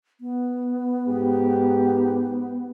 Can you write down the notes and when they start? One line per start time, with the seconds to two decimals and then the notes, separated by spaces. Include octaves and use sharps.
0.21 B3
1.07 G#2 G4